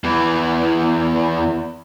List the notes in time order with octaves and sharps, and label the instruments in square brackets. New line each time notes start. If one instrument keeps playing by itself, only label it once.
[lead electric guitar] E2 E3